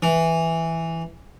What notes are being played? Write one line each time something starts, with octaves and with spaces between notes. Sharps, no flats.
E3